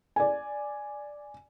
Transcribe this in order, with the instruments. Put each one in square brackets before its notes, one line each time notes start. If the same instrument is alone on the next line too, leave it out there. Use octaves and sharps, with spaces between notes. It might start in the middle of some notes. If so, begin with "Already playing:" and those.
[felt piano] D5 G#5